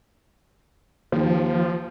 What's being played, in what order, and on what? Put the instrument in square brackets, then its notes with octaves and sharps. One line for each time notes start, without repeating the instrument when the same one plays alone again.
[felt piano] D#2 [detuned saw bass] F3